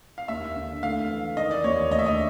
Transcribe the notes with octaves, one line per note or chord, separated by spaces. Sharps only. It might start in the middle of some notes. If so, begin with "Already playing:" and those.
F5
D#2 E5
D3
A3 F5
E3
D#3 D#5
D5
D#2 C#5
D2 D#5
E5
D#5